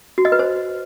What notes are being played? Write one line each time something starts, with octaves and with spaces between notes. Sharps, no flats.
F#4
D#5
B4
C5